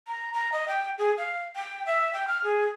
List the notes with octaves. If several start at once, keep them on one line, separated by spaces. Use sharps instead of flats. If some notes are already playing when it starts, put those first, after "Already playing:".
A#5
A#5
D#5
G5
G#4
F5
G5
E5
G5
F6
G#4